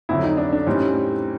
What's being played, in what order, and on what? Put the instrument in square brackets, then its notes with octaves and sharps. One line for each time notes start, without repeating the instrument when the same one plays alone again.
[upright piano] F2 D3 F#3 [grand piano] E4
[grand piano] D#4
D4
D4
[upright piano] A2 E3 G3 C4 D#4 [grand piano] C#4